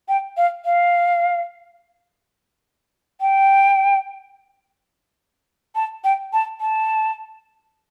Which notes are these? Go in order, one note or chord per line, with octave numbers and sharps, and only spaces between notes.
G5
F5
F5
G5
A5
G5
A5
A5